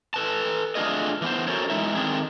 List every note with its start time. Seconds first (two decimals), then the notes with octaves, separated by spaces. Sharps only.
0.14 A4 B4 A5
0.75 A3 D4 F4 G#4 D#5
1.22 E3 B3 C5
1.47 C#4 F#4 A4 A#4 C5 C#5
1.70 E3 G#3 D#4 E5
1.95 D#3 A3 C4 D4 D#4 G#4